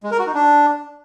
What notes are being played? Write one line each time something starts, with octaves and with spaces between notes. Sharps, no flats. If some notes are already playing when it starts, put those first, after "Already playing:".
G#3
A#4
F#4
D#4
D4